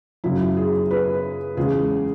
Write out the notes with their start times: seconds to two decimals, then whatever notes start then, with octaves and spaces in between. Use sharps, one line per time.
0.24 F#2 C#3 F#3 E4
0.57 G#4
0.91 B4
1.57 E2 C#3 G#3 G#4